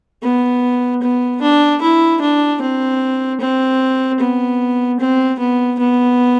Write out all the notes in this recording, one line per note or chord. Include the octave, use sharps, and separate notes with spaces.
B3
B3
D4
E4
D4
C4
C4
B3
C4
B3
B3